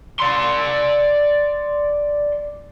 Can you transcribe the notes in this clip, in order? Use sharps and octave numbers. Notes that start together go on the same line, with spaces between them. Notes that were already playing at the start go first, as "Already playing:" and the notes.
D5 C6